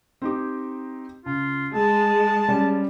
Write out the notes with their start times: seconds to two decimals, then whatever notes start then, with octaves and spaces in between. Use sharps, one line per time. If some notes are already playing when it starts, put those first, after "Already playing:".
0.22 C4 D#4 G4
1.26 C#2 F4
1.74 G#3 G#4 A5
2.48 G3 C#4